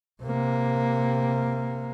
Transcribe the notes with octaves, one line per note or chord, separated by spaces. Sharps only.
C3 A#3